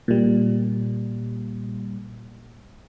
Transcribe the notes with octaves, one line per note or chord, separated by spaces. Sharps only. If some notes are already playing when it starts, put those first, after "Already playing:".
A#2 G3